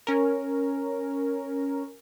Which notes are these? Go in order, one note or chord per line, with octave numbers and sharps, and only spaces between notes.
C#4 A#4